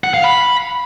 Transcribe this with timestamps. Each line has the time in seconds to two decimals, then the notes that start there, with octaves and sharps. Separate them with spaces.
0.04 F#5
0.14 F5
0.24 B5